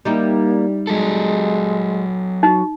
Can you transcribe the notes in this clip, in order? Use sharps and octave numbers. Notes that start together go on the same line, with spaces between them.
G3 A#3 D#4 E4
F#3 G#3 A4
D#4 F#4